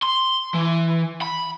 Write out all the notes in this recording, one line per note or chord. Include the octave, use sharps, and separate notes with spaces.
C6
E3
B5